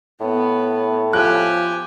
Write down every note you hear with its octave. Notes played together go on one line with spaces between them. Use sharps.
A2 B3
F3 G4 G#5 F#6